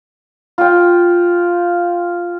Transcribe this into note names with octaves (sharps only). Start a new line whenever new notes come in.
F4 G5